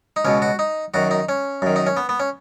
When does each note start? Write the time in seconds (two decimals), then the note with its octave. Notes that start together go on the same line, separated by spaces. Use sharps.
0.16 D#4
0.25 C#2 B2 C#4
0.42 F#4
0.59 D#4
0.94 F#2 D#3 F#4
1.11 D#4
1.29 C#4
1.62 F#2 D#3
1.76 D#4
1.87 C#4
1.97 B3
2.09 B3
2.20 C#4